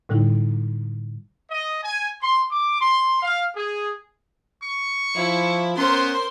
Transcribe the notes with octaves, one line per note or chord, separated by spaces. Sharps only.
A2 D3 G3 D#4 E4
D#5
G#5
C6
D6
C6
F5
G#4
C#6
F3 E4
B3 C#4 A#4 C5 C6